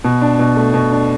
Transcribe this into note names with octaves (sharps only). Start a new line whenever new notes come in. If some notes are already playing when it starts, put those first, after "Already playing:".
B2
D4
B2
A3
B2
D4